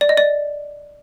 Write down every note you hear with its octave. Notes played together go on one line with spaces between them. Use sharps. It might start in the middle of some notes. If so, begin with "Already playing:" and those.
D5
D#5
D5